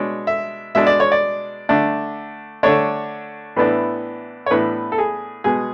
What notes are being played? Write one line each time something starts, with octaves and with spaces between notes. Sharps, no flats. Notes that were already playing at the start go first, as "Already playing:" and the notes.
Already playing: B2 G#3 D4 C#5
E5
B2 G#3 D4 E5
D5
C#5
D5
D3 A3 D4
D3 A3 D4 C#5
A2 E3 B3 D4
C#5
A2 E3 B3 D4 B4
A4
G#4
B2 G#3 B3 G#4